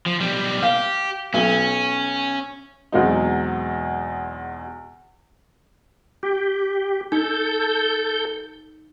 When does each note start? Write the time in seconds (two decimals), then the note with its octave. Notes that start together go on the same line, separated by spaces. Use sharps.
0.06 F3
0.19 B1 G3
0.63 G4 F5
1.34 B1 C#4
2.92 E2 B2 F#3 G#3 C4 D#4
6.23 G4
7.12 D#4 A4 G6